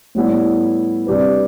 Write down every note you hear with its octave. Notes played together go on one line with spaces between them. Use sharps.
A2 G3 B3 E4
C3 G3 D4 G4 B4